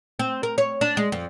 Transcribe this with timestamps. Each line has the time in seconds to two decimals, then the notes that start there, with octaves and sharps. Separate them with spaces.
0.19 C4
0.43 A#4
0.58 C#5
0.81 D4
0.97 G#3
1.12 F2